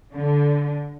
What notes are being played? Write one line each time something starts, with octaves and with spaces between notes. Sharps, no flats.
D3